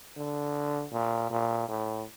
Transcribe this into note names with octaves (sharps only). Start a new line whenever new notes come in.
D3
A#2
A#2
A2